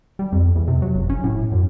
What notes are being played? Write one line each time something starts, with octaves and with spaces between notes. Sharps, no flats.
G3
F2
E2
C3
F#3
F#1
C#4
A2
F#2